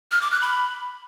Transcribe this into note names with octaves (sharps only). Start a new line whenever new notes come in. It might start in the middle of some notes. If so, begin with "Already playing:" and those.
F6
D6
F#6
B5